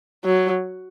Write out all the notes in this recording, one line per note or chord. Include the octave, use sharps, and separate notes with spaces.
F#3